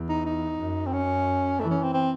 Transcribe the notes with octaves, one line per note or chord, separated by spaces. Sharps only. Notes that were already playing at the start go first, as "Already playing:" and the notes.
Already playing: E2
D#4
D#4
F#2
C4
C#4
E3 A3
C#4
C4
C4